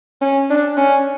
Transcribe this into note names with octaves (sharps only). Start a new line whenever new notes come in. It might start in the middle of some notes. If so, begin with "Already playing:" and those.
C#4
D4
C#4